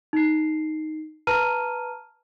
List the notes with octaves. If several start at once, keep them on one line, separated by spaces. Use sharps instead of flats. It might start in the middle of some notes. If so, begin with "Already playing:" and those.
D#4 C7
B4 A5 A#5 F6 D#7